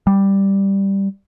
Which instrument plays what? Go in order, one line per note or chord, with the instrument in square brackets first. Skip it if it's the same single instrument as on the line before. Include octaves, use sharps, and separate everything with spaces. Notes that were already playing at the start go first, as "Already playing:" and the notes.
[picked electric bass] G3